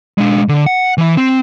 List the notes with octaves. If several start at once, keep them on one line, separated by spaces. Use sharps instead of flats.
G#3 D4
D3
F#5
E3 E5
C4